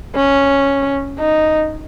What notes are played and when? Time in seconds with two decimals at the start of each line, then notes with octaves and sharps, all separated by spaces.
0.15 C#4
1.19 D#4